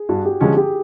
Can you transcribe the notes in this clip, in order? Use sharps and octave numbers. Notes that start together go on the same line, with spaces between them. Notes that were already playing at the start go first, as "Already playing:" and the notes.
Already playing: G#4
G2 F#4
G4
D3 F3 G#3 C#4 G#4
G4